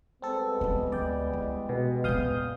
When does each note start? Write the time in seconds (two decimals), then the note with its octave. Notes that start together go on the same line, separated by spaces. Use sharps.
0.22 G3 G#3 B3 C4 A4
0.61 D4 F4
0.92 D2 D5 G5
1.33 E4
1.69 B2
2.04 E2 A#2 F5 D#6 G6